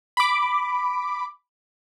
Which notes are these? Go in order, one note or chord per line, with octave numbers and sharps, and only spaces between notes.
B5 D6